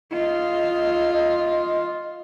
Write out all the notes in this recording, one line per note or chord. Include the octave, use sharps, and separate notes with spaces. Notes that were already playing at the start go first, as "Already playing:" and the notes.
F4 D#5